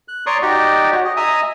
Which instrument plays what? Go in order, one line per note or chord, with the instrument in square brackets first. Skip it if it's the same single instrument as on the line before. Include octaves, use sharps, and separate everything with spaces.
[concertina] F#6
C#5 D5 A#5 C6 C#6 D#6
D#4 F#4 G4 D5 D#5
F#4 C#5
G#4 D#5
D#5 E5 G#5 A#5 D#6